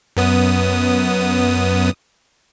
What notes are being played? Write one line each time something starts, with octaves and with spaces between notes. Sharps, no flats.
F#2 B3 D#6